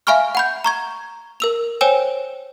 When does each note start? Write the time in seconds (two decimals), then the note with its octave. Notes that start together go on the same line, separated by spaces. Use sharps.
0.07 E5 F5 G#5 B5 C#6 F6
0.35 F#5 B5 G6
0.64 A#5 C#6 G#6
1.40 A#4 E6 F7
1.81 C5 C#5 G5 G#5 E6 E7